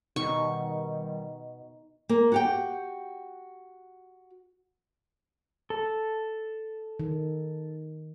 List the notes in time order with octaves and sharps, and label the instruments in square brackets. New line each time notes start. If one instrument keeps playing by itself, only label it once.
[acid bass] B2 [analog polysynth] D#3 G3 [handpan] D#4 [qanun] C#6
[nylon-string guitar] A#3
F#4 G4 G5
[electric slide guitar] A4
[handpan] D#3